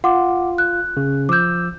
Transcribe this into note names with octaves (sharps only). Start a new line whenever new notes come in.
F4 F#5 D6
F#6
C#3
F3 D6 E6 G6